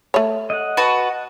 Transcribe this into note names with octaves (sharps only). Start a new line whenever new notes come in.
A3 C#5
D#5 F#5
F#4 B4 A5